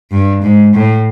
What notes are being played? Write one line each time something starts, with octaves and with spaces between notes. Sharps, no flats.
G2
G#2
A2